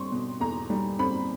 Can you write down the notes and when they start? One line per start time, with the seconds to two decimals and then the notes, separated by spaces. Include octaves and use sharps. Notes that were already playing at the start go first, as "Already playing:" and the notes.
Already playing: G3 C4 C6 C#6
0.12 B2
0.40 E2 A#5
0.70 G3
0.99 C4 B5